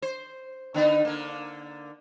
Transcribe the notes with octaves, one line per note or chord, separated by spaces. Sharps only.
C5
D3 B3 D#4
D3 A#3